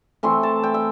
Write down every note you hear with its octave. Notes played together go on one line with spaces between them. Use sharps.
E3 A3 C4 E4 C6
A5
G5
E5